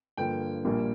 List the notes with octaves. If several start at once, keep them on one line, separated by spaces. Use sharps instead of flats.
G2 D3 F3 A#3 G5
A#1 A#2 G3 A#3